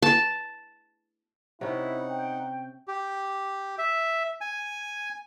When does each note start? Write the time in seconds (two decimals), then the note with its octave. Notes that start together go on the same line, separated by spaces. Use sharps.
0.02 A5
1.61 C3 C#4 D#4 E4 F#5
2.08 G5
2.88 G4
3.78 E5
4.41 G#5